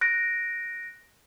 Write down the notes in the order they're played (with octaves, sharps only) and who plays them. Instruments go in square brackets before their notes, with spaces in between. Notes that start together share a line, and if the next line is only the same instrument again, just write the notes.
[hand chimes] F#6 A#6 D7